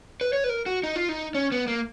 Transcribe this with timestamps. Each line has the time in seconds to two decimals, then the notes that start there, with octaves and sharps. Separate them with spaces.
0.21 B4
0.33 C#5
0.44 B4
0.49 A#4
0.66 F#4
0.83 D#4
0.96 F4
1.09 D#4
1.35 C#4
1.52 B3
1.68 A#3